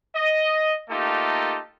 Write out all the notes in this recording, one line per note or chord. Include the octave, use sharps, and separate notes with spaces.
D#5
A3 A#3 D#4 F4 G4 A4